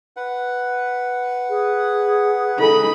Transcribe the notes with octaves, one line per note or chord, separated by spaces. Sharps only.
B4 F#5
G#4
C#3 E4 A4 D#5 G#5 B5